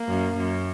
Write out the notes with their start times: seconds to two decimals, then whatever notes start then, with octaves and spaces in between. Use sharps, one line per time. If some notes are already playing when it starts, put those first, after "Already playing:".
Already playing: A#3
0.09 F#2
0.37 F#2